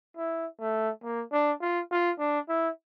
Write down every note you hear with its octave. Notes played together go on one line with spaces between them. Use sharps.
E4
A3
A#3
D4
F4
F4
D4
E4